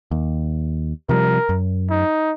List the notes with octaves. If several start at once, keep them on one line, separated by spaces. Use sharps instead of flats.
D#2
C3 F3 G3 A#4
F#2
D#4